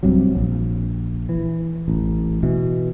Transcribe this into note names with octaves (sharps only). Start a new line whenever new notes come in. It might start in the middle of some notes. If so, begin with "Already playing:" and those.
C2 G2 C3 F#3
A#1
E3
A1
B2 E3